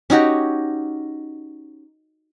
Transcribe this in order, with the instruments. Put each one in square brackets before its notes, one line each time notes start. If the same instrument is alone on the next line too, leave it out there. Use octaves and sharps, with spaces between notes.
[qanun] C#4 D#4 F#4 G4